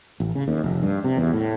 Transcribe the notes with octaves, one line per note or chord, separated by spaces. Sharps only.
A1
C#3
D#2
F1
G2
C3
E2
A2